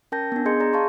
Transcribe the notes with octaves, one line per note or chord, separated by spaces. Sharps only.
C#4 A#4 G5 A5 G6 A#6
B3 D4
G#4 D#5 C6 G6 G#6 C#7
G#4 D5 A#5 G6 A#6
F5 A5 C6 C#6